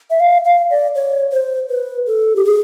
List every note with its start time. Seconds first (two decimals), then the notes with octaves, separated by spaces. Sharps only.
0.10 E5
0.20 F5
0.45 F5
0.70 D5
0.95 C#5
1.32 C5
1.70 B4
2.07 A4
2.36 G4
2.45 G#4